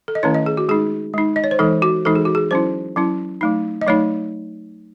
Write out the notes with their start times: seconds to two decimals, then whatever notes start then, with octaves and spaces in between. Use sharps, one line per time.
0.08 A4
0.15 D#5
0.23 D#3 A3 C#4 E4 C#5
0.34 D#5
0.46 G#4
0.57 F#4
0.69 G#3 D#4 G#4
1.14 G#3 D#4
1.36 D#5
1.44 C#5
1.51 C5
1.59 E3 G#3 D#4 A4
1.82 F#4
2.05 E3 G#3 D#4 A4
2.15 G#4
2.25 F#4
2.35 G#4
2.51 F#3 C#4 E4 C5
2.96 F#3 C#4 E4
3.41 F#3 A3 D#4
3.81 D#5
3.86 F#3 A3 D#4 C#5